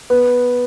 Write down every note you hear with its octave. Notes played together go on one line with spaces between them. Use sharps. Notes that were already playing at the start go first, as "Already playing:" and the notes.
B3